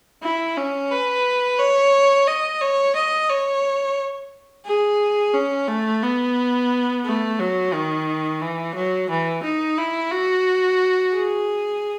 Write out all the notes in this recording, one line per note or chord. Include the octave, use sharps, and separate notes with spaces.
E4
C#4
B4
C#5
D#5
C#5
D#5
C#5
G#4
C#4
A3
B3
A3
F#3
D#3
E3
F#3
E3
D#4
E4
F#4
G#4